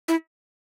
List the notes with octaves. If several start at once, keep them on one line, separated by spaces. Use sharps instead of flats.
E4